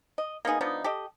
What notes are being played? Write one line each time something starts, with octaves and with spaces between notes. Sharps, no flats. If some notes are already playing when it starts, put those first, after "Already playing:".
D#5
A#3 B3 D#4 G#4
F3 B3 D4 D#4
G4 A4 D#5